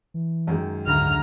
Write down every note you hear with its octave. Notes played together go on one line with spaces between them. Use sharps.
E3
F#2 D#3 G#3 G5
D2 G#2 A#5 F6